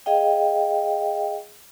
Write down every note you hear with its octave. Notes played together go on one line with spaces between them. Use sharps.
G#4 D#5 F5 G5